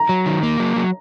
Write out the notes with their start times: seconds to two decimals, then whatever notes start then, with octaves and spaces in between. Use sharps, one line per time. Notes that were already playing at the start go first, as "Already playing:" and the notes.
Already playing: A#5
0.09 F#3
0.26 D#3
0.43 A#3
0.60 F#3
0.76 F#3